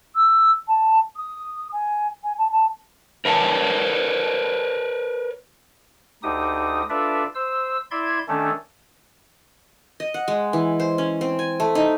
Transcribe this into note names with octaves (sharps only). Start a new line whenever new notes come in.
E6
A5
D#6
G#5
G#5
A5
A5
A#4 B4 C#5 A5
D2 D#4 G4 D#6
D4 F4 A4 B4 D5 E5
C5 E6
E4 D5 E5 C6 G#6
D#3 A3 C#4 D4 A4
D#5
F#5
G#3
E3
C5
C#4
C4
G#5
A3
D#4